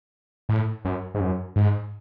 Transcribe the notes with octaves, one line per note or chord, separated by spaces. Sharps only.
A2
F#2
G#2
F#2
G#2